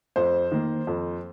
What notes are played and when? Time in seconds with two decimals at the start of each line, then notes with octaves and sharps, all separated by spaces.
0.16 F2 C5
0.52 D#3 A#3
0.87 F2